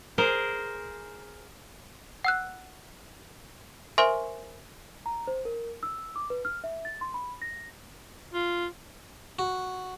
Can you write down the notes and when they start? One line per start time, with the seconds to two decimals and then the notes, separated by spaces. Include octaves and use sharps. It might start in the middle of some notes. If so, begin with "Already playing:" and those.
0.18 G#4 A#4 C5
2.24 F#5 E6 F#6
3.98 A#4 C5 E5 G#5 C6 C#6
5.06 A#5
5.27 C5
5.45 A#4
5.83 E6
6.16 D6
6.30 B4
6.45 F6
6.64 E5
6.85 A6
7.01 C6
7.14 B5
7.42 A#6
8.34 F4
9.39 F#4